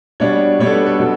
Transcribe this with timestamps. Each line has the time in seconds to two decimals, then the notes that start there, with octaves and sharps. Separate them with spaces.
0.20 B2 G3 D4 C#5
0.59 B2 G3 D4 C#5
0.66 A4
0.73 B4
0.86 A4
0.99 B2 F#3